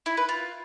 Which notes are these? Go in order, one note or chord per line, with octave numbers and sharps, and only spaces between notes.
E4
B4
F4